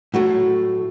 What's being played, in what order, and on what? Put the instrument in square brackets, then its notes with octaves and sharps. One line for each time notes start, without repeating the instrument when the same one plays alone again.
[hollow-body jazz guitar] A2 F#3 A3 [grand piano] F#4